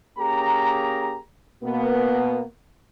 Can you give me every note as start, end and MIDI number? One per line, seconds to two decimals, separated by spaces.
0.19 1.17 58
0.19 1.17 61
0.19 1.17 67
0.19 1.17 68
0.19 1.17 82
1.64 2.42 47
1.64 2.42 58
1.64 2.42 59